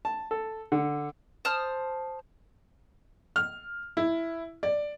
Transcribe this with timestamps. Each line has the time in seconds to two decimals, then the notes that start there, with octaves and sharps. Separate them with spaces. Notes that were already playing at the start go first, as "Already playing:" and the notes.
0.05 A5
0.31 A4
0.72 D3
1.45 C5 A5 D#6 F6
3.36 F6
3.97 E4
4.63 D5